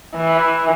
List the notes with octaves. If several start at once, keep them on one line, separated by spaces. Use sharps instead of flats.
E3